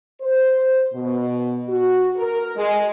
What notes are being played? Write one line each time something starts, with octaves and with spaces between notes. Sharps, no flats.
C5
B2
F#4
A#4
G#3